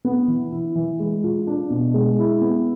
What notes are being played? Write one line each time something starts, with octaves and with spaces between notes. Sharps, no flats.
B3
E3
E4
E3
G#3
F4
D4
B2
G#3
E4
B3